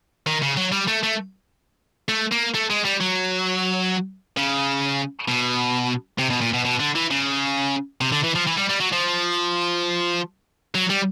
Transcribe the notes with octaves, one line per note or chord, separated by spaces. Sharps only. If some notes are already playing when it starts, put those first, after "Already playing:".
D#3
C#3
F#3
G3
A3
A3
A3
A#3
A3
G#3
G3
F#3
C#3
B2
C3
B2
A#2
B2
B2
D3
E3
C#3
C3
D3
E3
F3
E3
G3
G3
F#3
F3
F#3
G3